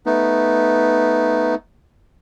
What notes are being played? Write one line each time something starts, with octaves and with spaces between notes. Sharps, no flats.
A3 B3 D#4